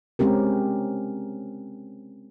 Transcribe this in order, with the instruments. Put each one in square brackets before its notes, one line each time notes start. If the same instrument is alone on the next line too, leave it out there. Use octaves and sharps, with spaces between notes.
[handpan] G#3 C4 C#4 G4 A#4